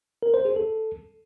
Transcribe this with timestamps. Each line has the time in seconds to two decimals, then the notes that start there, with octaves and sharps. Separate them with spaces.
0.23 A#4
0.34 C5
0.45 G#4
0.56 A4